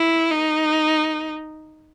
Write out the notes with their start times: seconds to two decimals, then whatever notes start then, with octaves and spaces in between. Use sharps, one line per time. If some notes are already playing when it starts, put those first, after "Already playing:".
Already playing: E4
0.31 D#4